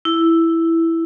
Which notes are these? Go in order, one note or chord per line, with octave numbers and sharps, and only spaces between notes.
E4